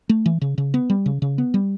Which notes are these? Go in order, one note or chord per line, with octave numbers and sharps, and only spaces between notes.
A3
E3
C#3
C#3
B3
G3
C#3
C#3
B3
G3